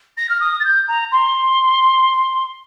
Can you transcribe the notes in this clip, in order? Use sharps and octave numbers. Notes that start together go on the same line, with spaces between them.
A#6
F6
D#6
A6
G6
A#5
C6